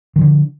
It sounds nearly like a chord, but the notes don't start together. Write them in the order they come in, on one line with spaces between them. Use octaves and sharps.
D#3 F3 D3